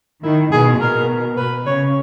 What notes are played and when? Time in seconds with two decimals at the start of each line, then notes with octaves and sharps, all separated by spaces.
0.24 D#3 E4
0.52 B2 G#4
0.81 B2 A#4
1.37 B4
1.66 C#3 C#5